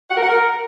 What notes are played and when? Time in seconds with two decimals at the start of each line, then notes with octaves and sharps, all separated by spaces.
0.10 F#5
0.16 A#4
0.23 F#5
0.29 A#4